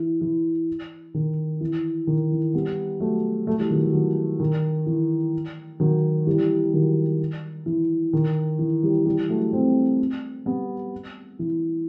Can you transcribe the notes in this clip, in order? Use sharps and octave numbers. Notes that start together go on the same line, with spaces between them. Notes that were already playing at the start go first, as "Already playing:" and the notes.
Already playing: E3
E3
D#3
E3
D#3
E3
G3 B3
F#3 A3
F#3 A3
E3 G3
D#3 F#3
E3
D#3 F#3
D#3
E3
D#3 F#3
E3 G3
D#3 F#3
E3
D#3
E3
E3 G3
E3 G3
F#3 A3
A3 C4
G3 B3
E3